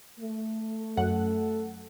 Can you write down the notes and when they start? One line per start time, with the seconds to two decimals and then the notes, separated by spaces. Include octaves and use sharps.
0.19 A3
0.97 F#2 A4 F#5